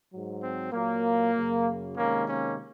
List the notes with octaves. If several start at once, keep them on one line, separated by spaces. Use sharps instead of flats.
G#2 F#3
C4
A#2 F#3 A#3
F#2 C#3 F#3
C3 D#3 G#3 A#3 C#4
A#3 C#4